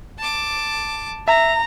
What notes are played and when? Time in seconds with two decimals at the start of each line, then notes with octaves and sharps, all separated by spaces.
0.19 A5 D6
1.28 E5 A#5